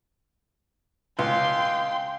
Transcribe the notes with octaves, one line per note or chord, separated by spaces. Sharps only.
C#2 F5 G5 C6